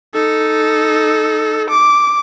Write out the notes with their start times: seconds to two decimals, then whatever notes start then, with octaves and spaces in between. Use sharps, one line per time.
0.14 D#4 A4
1.70 D6